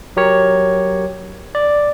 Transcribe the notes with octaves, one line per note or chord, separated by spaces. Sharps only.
F#3 G4 A#4 C#5
D5